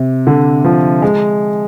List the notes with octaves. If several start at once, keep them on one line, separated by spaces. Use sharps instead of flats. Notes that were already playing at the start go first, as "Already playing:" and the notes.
Already playing: C3
D3
F3
G#3